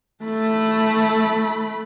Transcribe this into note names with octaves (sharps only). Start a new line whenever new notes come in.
A3 B5